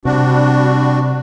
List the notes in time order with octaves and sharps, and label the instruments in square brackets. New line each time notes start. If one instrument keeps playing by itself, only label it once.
[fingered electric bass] C3 [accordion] G3 D4 F#4